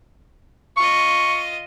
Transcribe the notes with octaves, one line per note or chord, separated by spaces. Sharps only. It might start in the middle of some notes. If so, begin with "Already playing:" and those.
F4 D#5 C#6